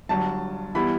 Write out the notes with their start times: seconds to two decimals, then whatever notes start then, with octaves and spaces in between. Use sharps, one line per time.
0.09 G1 G2 F#3 A5
0.75 E3 G3 B3 E4 B5